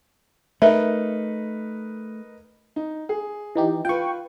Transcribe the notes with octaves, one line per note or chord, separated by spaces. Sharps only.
A3 D#4 A#4 B4 E5
D#4
G#4
E3 D#4 G4
F4 B4 G5 C#6